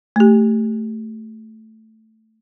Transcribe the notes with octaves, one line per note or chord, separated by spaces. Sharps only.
A3 G4